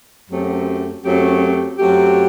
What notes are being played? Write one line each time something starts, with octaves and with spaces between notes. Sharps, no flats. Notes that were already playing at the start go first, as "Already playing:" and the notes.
F#2 F#3 A3 C4 G4
F#2 F#3 A3 C4 G4
F#2 F#3 A3 C4 G4